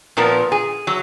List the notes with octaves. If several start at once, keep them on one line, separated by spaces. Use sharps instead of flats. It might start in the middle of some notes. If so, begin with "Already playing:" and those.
A#2 F3 B3 A#4
G#4
F#3